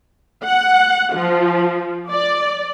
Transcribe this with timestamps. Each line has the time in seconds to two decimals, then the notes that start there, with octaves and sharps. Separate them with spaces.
0.46 F#5
1.14 F3
2.10 D5